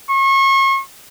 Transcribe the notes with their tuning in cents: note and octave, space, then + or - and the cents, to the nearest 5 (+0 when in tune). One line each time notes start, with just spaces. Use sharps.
C#6 -35